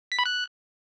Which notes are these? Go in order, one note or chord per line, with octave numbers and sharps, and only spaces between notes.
B6
B5
F#6